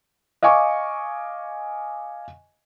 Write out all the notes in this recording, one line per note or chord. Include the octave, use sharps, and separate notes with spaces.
D#5 F5 G#5 C#6 D6